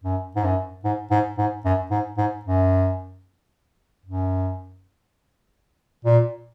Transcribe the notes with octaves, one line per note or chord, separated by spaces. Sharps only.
F#2
G#2
F#2
G#2
G#2
G#2
F#2
G#2
G#2
F#2
F#2
A#2